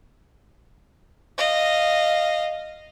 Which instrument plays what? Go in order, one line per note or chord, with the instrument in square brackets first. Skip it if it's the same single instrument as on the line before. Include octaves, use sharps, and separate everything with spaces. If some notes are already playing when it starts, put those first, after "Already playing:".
[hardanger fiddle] D#5 F5